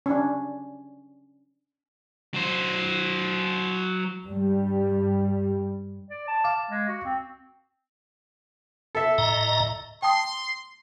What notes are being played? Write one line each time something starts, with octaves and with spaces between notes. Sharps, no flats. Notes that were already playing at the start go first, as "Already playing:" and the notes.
C#4 D4
F#3 C5
G2 G3
D5
A5
F5 D6
G#3
F#4
C4
A4 E5
A2 D#5 A#5
G5 A5 C6 D#6